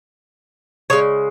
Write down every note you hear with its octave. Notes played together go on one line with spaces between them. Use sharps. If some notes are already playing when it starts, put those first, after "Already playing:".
C#3 G#3 C#5